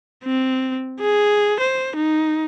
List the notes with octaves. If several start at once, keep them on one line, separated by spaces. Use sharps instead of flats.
C4
G#4
C5
D#4